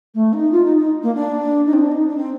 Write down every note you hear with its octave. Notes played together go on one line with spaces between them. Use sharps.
A3
D#4
F4
D#4
D#4
A#3
D4
D#4
C4
D4
D#4
D4
C4